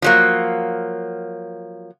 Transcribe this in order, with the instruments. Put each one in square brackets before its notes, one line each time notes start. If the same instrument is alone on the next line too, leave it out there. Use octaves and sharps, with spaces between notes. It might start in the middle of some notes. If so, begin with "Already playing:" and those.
[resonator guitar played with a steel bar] F3 F#3 A#3